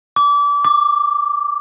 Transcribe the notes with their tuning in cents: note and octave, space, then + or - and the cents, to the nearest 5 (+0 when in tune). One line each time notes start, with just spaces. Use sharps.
D6 -30
D6 +10